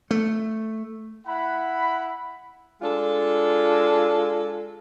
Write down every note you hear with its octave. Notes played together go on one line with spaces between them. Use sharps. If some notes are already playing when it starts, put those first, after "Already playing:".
A3
E4 F#5 B5
G#3 D4 F4 A4